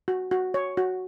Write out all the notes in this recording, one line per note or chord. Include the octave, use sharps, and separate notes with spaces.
F#4
F#4
C#5
F#4